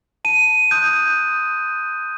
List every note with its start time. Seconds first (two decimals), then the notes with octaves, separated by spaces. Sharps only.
0.25 A5 D#7
0.71 C6 D#6 F#6 G6